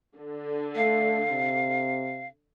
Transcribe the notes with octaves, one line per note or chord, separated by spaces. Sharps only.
D3
A3 F5
C3